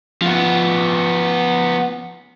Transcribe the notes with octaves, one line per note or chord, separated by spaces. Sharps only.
F3 B3